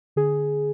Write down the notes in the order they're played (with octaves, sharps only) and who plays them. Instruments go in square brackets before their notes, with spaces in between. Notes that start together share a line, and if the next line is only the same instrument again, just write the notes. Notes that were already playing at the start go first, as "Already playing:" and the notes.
[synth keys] D3 G#4